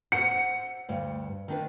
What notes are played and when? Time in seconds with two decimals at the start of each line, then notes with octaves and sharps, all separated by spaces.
0.12 C5 F#5 C#7
0.89 D2 G2
1.48 D#3 D4 B4